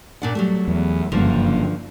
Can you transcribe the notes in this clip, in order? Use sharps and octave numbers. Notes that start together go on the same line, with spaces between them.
A#2 D4 F#5
F#3 G3 A3
E2
F#1 G2 D3 F3 A#3